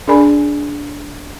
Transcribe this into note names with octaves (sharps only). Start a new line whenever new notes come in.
D4 G#4 A#4 D5 G#5 B5